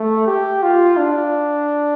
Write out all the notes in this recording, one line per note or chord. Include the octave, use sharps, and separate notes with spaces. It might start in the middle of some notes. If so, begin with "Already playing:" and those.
Already playing: A3
G4
F4
D4